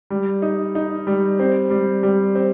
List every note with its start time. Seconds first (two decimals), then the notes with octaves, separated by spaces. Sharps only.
0.10 G3
0.42 D#4
0.75 D#4
1.07 G3
1.39 C4
1.70 G3
2.03 G3
2.35 C4